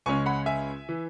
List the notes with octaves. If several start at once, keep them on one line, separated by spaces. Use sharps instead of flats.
C#2 C#3 G#3 C#4 G#5 C#6
F#5 B5
E5 G#5
E3